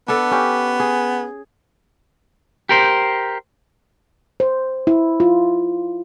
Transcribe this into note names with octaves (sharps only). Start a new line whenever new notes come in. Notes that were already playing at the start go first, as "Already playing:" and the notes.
B3 D4 A4
C#4 G4
G#4
G4 A#4 C5
C5
E4
F4